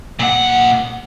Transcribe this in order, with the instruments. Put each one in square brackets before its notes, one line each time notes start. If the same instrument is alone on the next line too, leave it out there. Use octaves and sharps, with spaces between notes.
[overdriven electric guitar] A#2 F#5